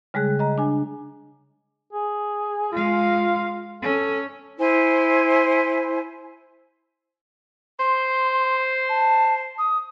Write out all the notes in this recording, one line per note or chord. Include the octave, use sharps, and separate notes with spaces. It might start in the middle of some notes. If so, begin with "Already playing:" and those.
C#3 G3 G#3 G#4 F#6
D#5 A#5
D4 G#5
G#4
G#3 F4 F5
C#4 A4
E4 C5 G#5
C5 C6
A5
D#6